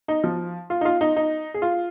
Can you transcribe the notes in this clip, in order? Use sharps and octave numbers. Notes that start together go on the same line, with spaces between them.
D#4
F3
F4
D#4
F4
D#4
D#4
G#4
F4